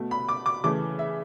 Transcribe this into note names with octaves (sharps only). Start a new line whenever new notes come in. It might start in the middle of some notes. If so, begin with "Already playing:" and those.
Already playing: B2 A3
B5
D6
D6
C#3 E3 A3 D6
E5